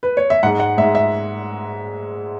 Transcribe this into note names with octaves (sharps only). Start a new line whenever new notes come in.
B4
C#5
E5
G#2 G#3 F#5
F#5
G#2 G#3 E5
E5